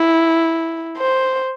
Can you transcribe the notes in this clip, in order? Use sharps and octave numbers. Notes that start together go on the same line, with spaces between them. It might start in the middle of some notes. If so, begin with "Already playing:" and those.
Already playing: E4
C5